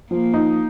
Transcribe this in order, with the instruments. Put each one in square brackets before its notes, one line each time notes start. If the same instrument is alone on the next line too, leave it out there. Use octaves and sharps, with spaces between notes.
[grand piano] F3 [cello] A#3
[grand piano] D#4